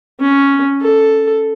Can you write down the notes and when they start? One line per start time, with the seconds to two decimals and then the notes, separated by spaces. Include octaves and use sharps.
0.20 C#4
0.81 A4